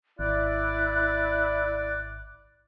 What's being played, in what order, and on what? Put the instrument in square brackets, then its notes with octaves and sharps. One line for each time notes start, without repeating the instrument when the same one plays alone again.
[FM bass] G#1 [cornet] E4 [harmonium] D5 [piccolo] F#6